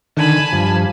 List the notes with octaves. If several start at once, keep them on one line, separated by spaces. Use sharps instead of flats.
D3 D#3 G#5 A5 B5
G2 F3